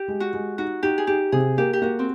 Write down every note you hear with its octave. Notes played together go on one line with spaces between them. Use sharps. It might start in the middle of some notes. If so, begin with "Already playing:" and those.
Already playing: G4
G#3
F#4
G#3
D#4 F#4
D#4 G4
G#4
D#4 G4
C3 G#4
A#3 G4
G4
A#3 F#4
C4